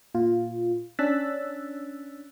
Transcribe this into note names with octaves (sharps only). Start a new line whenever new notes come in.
A#2 F4
C#4 D4 E6 F#6 A6 B6